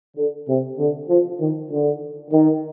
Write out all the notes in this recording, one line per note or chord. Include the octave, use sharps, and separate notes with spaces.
D3
C3
D3
F3
D#3
D3
D#3